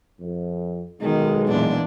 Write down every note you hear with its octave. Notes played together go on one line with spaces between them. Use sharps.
F2
B1 D#3 G#3
E2 A#2 D4